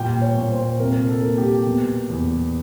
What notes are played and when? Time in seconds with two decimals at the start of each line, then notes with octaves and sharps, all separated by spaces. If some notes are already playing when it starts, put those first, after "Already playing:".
Already playing: A#2 G3 G5
0.22 C#5
0.36 A#2
0.51 C5
0.79 C3 A#4
1.09 A4
1.23 A#3
1.38 G4
1.66 B2
2.09 E2